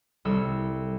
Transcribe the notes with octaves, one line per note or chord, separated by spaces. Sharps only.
C2 A4 E6